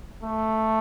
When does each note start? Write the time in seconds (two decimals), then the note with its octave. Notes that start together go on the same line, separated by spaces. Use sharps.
0.23 A3